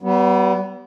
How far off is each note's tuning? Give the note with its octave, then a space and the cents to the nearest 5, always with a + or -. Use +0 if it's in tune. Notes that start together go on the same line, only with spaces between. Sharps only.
G3 -40 B3 +0